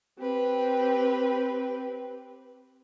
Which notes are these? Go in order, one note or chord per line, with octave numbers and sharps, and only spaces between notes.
C4 G4 B4